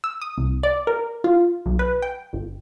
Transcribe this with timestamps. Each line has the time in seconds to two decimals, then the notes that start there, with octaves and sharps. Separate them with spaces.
0.04 E6
0.21 D#6
0.38 C2
0.63 D5
0.87 A#4
1.24 F4
1.66 B1
1.79 B4
2.02 G5
2.33 G1